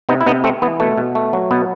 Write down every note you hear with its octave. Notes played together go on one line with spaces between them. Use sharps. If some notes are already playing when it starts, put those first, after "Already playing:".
C3 B3 D#4
E4
C3 B3 D#4
A3 C4
E3 B3
B2 A3
B2
A3
F#3
B2 B3